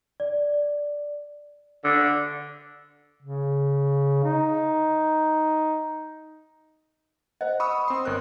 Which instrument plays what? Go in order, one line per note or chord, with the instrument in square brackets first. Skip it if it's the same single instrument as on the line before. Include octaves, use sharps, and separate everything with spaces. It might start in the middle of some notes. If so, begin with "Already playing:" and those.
[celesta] D5
[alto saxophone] D3
[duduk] C#3
D#4
[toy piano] C5 D#5 [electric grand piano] F#5
[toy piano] B5 [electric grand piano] C#6 D#6 E6
[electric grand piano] C4 C6
G1 A#4 F#6